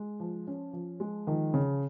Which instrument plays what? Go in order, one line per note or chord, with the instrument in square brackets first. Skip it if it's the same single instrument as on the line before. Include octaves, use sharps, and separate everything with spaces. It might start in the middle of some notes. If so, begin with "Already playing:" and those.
Already playing: [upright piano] G#3
F3
C#4
F3
G#3
[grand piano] D#3 [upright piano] F3
[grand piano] C#3 [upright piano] C#4